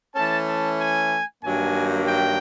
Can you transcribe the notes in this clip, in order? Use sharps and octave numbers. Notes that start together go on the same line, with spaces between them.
E3 A3 C#4 A5
A5
G#5
G2 D#3 F#3 A#3 G#5
G5